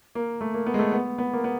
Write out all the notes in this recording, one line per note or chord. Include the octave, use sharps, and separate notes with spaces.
A#3
A3
A#3
B3
G#3
A3
B3
B3
A#3
B3